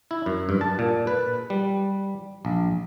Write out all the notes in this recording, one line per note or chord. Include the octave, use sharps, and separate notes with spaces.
E4
F#2
G2
A5
A#2
B4
G3
A#1